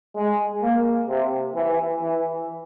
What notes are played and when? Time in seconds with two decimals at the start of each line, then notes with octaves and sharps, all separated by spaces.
0.15 G#3
0.62 A#3
1.08 C3
1.55 E3
2.01 E3